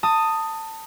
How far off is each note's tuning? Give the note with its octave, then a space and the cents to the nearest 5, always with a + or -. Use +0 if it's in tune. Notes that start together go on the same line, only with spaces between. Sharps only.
A5 +25 D#6 +0